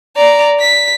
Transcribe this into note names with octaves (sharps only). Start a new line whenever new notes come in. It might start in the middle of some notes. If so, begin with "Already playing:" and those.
D5 A#5
B6